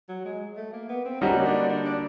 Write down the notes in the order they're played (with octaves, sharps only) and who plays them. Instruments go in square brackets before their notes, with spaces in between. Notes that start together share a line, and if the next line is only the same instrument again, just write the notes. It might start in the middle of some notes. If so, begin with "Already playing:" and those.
[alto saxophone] F#3
G#3
A3
A#3
B3
C4
[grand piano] D3 G3 A#3 D#4 F#4 [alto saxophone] C#4
[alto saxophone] C#4
D4
D4
D4